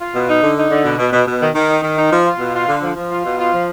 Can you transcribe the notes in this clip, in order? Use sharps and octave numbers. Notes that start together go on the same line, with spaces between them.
F4
B2
D#4
D3
D#4
D3
B2
B2
B2
B2
D#3
D#3
D#4
D#3
D#4
F3
F4
B2
F4
D3
F3
F3
F4
B2
F4
F3